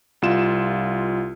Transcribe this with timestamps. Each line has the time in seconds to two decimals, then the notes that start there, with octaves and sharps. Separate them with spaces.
0.22 C2 F4 E7